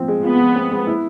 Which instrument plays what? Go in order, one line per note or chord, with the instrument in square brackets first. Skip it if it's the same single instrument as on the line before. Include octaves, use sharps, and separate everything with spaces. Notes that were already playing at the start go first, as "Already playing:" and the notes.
Already playing: [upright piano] F3 C4
G#3
[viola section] B3 [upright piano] F4
[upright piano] F3
C4
G#3
E4